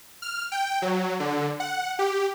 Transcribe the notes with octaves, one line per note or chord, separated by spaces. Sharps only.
F6
G5
F#3
D3
F#5
G4